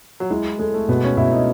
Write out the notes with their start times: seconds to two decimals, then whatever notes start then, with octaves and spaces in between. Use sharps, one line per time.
0.20 F#3
0.30 G#3 E4
0.59 G#3 A4
0.74 A3
0.88 B2 B3
1.04 C#4
1.17 B2 E4
1.32 D#4